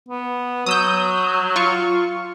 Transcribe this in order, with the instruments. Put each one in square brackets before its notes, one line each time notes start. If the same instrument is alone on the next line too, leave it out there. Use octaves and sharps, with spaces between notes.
[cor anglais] B3
[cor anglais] F#3 [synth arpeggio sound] D#6 E6 G6
[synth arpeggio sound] F4 C#6